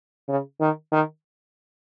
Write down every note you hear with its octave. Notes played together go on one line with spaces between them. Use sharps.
C#3
D#3
D#3